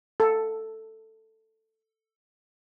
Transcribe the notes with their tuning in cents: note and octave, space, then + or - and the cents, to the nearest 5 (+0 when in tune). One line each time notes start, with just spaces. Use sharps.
A4 +5